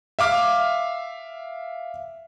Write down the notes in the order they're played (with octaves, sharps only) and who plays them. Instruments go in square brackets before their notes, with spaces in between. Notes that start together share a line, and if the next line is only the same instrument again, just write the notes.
[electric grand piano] E5 F5 D6 F6